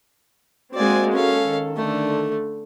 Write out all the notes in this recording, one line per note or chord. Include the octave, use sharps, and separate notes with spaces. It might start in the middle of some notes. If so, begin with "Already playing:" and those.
G#3 A#3 C4 F#4 D5 G#5
C#4 A4 F5
D#3
D3 A3